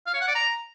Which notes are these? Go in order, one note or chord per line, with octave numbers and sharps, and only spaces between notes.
F5
C#5
F#5
D5
A#5